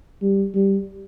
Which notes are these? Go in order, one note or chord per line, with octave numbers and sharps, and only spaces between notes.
G3
G3